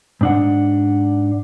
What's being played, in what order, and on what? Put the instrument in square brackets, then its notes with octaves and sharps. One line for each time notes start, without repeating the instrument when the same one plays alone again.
[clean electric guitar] G#2 D4 F#5